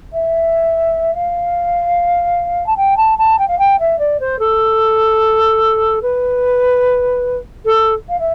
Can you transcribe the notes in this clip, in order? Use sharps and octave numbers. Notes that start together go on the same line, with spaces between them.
E5
F5
A5
G5
A5
A5
G5
F5
G5
E5
D5
C5
A4
B4
A4
F5
E5